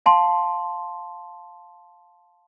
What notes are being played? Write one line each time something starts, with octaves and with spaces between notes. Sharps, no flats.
F5 A5 C6